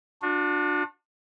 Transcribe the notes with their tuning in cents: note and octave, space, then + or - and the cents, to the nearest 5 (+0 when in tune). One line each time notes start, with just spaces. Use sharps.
D4 +15 F#4 -40